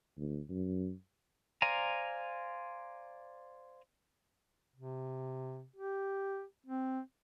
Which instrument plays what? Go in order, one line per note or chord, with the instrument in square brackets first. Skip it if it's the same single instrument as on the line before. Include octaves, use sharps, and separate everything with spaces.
[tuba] D2
F#2
[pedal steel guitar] C5 D5 F5 G#5 A#5
[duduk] C3
G4
C4